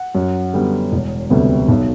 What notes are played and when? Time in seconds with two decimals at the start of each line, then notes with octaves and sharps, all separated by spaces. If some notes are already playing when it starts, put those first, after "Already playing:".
Already playing: F#5
0.15 F#2
0.53 D3 G3 B3
0.92 E1
1.30 D2 C3 G3 B3
1.68 B1